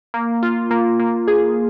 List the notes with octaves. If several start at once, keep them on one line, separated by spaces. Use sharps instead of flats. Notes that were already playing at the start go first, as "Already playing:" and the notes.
A#3
F4
A#3
A#3
G#4